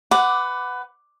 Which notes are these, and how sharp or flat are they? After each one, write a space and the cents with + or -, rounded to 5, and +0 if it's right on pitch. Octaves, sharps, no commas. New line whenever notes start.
B4 +20 F#5 +0 D6 +0